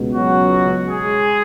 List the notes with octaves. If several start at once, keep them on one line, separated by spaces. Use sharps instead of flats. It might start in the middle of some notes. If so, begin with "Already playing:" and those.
Already playing: C#2 B2
F#3 F#4
G#3 G#4